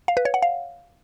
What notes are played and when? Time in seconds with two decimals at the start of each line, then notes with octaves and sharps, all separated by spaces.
0.08 F5
0.17 B4
0.25 C#5
0.34 F#5
0.42 F5